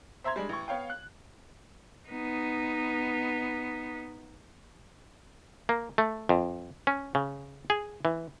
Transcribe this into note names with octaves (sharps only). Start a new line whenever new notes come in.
C5 E5 A#5 C6 G#6
G3 G#3 D4
A1 C#6
B3 C#5 F5 G5
F#6
B3 D#4
A#3
A3
F2
C#4
C#3
G#4
E3